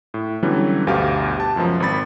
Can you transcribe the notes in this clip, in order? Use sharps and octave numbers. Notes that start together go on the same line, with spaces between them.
A2
D3 E3 F#3 G3 B3 C#4
G1 D2 B2 G4 F5
G4 A5
C#2 F#2 B2 F3
G#1 C4 B5 A6